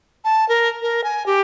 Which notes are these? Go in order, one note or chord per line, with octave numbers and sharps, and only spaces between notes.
A5
A#4
A#4
G#5
G4